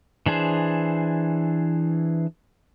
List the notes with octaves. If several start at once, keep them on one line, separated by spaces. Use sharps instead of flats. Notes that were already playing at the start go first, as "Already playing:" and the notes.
E3 D4 G#4 C5